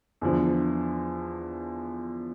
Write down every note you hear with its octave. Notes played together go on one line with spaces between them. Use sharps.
E2 D3 F3